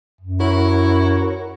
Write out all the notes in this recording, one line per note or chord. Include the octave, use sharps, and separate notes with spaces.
F#2
E4 F#4 A#4 C#5